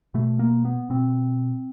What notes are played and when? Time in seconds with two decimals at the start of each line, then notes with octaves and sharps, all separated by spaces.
0.14 B2 A3
0.39 A#3
0.65 B3
0.90 B2 C4